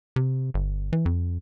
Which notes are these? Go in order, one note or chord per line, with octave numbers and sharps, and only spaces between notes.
C3
G1
E3
F2